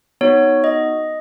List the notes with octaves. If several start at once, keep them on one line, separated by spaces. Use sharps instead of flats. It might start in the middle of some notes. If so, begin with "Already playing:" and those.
B3 D#4 F#4 C#5
D#5